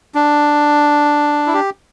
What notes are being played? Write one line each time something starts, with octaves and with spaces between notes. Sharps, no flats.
D4
E4
G4